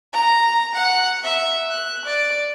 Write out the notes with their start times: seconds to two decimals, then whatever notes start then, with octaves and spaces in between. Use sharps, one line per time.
0.13 A#5
0.75 F#5
1.24 E5
1.70 F#6
2.05 D5